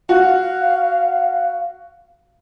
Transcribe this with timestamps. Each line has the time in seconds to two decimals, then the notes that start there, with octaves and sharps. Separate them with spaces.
0.09 F#4 F5